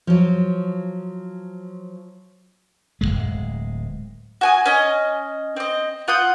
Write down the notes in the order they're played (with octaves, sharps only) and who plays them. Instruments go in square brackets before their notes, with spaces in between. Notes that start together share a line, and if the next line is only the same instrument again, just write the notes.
[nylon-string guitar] F3 F#3
[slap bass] D1 C#2 G#3
[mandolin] F#4 G#5 D#6
C#4 D#5
C4 D#5
F4 F#5 D#6 G6